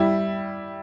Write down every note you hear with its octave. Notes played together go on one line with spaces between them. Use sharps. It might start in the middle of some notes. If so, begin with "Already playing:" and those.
Already playing: G3 E4